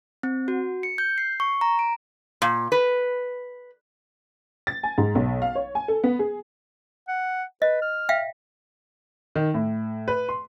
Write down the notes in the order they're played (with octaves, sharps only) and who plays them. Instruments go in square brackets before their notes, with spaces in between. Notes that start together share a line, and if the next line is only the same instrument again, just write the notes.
[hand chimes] C4
F#4
C#7
G6
C7
C#6
A#5
D7
[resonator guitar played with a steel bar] A#2
B4
[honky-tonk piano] A6
G#5
G#2
B1
F5
C#5
G#5
A4
B3
G#4
[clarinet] F#5
[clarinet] B4 [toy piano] D#5
[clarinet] F6
[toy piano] E5 F5 G5
[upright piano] D#3
A2
B4
C6